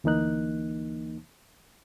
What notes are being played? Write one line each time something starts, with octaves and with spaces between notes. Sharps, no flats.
D2 E3 A#3 D#4 F#6